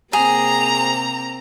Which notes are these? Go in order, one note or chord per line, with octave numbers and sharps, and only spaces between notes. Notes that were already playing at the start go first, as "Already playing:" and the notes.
C3 A#3 C4 G#4 A#5